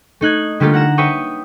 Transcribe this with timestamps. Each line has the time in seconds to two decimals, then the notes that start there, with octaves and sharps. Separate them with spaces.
0.21 A3 D#4 F#6 G#6
0.60 D3 G3 A3 A#3 F4 G4
0.74 F#5 A#5 E7
0.98 B4 C#5 E5 G5 C#6 D#6